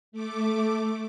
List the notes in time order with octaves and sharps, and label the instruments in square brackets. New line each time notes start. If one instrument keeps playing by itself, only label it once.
[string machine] A3 D6